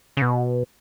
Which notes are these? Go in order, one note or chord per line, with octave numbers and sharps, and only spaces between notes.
C#3
B2